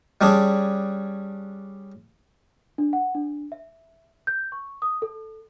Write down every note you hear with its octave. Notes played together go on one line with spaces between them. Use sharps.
G3 C#4 D4 G#4
D4
F#5
D4
E5
G6
C#6
D#6
A4